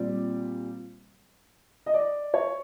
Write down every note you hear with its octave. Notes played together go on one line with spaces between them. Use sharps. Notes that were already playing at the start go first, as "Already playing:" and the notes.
Already playing: A#2 G3 C4 D5
D#5
D5
C#5